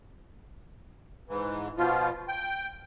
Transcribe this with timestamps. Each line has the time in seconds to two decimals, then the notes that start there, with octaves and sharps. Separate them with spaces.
1.29 G#2 E3
1.77 B2 F3 F4
2.28 G5